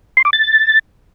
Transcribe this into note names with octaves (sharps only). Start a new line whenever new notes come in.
C6
D6
A6